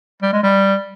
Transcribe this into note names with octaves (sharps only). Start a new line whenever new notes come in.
G3
G#3
G3